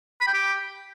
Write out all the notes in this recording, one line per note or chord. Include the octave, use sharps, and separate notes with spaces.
B5
G5
G4